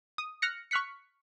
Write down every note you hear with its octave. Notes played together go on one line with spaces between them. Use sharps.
D#6
F6 F#6 A#6 C#7
C#6 F6 F#6 B6 C#7